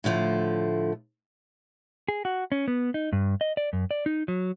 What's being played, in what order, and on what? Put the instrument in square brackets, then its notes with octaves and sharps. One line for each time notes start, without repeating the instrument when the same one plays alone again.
[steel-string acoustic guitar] A2 D3 F3 A3
[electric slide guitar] G#4
F#4
C#4
B3
D#4
G2
D#5
D5
F#2
D5
D#4
F#3